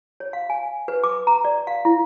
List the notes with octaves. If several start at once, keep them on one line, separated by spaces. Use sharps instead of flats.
C#5
F5
G#5
B4
D6
A#5
D5
F5
E4